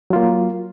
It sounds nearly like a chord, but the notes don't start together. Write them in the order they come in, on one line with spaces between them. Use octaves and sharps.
F#3 F4 A#3